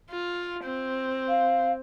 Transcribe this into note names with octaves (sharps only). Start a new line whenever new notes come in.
F4
C4
F5